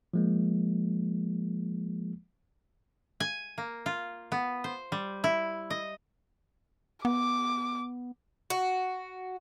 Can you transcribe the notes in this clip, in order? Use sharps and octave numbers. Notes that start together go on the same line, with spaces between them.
F3 G#3 A#3
G#5
A#3
F4
B3
C5
G3
E4
D#5
B3 D6
F#4